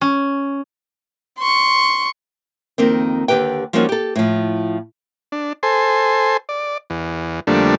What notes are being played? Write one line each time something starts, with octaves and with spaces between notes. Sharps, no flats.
C#4
C6 C#6
F2 D#3 A#3 C4
D#2 D3 G4 B4 G5
F3 G3 A#3 C#4 D#4 F#4
G4 A4
A2 F3
D4
A4 C5 G#5 C6
D5
E2
F2 D3 G3 A3 A#3 D4